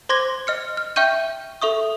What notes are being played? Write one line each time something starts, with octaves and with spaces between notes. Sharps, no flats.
C5 C6 D6 G#6 A#6 G7
D#5 F6 C#7
F6
E5 G5 C#6 G6 D#7
A4 E5 C#6 D#6